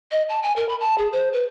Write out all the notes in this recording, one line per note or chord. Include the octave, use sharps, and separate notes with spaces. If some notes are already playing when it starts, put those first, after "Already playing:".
D#5
A5
G#5
A#4
B5
A5
G#4
C5
B4